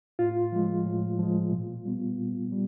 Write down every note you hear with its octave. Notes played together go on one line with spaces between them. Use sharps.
A2 F4
F3 G#3
A2
F3 G#3
A#2
G3 B3
A#2
G3